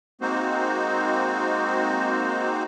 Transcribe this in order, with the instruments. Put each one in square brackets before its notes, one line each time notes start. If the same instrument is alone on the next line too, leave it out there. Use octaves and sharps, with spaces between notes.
[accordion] G#3 A#3 C4 D#4 F#4 C5